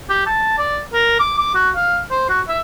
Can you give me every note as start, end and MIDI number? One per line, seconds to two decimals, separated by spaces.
0.10 0.24 67
0.26 0.55 81
0.58 0.80 74
0.94 1.16 70
1.20 1.34 86
1.39 1.51 86
1.55 1.70 66
1.76 1.99 77
2.11 2.28 72
2.29 2.41 66
2.48 2.59 76